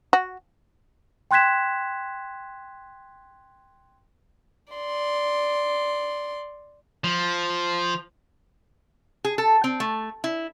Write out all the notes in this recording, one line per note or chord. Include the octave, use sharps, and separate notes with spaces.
F#4
G5 C6 F#6 G#6 B6 E7
D5 C6
F3
G#4
A4
C4
A3
E4